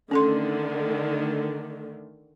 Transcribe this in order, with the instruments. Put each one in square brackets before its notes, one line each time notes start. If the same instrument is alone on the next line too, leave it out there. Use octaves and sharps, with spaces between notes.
[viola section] D3 D#3 A3 [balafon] C#4 A4 C6